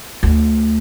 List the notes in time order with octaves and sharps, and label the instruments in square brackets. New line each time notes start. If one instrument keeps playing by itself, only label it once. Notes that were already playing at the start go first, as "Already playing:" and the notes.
[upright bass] D2